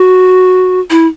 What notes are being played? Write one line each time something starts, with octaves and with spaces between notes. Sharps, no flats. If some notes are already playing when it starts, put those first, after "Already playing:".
Already playing: F#4
E4